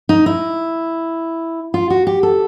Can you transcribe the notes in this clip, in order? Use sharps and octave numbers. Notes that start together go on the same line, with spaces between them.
D#4
E4
F4
F#4
G4
A4